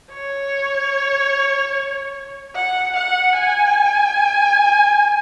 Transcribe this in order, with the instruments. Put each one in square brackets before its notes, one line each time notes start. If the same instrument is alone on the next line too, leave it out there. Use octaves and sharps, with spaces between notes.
[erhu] C#5
F#5
F#5
G#5